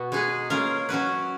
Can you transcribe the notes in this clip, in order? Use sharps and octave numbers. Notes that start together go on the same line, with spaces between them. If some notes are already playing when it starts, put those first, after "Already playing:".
Already playing: B2 B3 F#4
G#3 D#4 G#4 B4
A#3 C#4 F4 A#4
F#3 C#4 F#4 B4